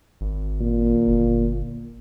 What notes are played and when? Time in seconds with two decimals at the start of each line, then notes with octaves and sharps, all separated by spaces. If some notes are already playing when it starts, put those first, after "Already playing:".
0.21 G#1
0.60 A#2
1.08 G1